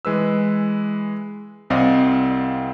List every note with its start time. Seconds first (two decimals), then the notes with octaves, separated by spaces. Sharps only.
0.05 E3 G#3 B4 E6
1.70 C2 C4 D5 D#5 F5 D#6